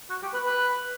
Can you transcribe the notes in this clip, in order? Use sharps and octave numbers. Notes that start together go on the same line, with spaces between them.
F#4
G4
B4
B4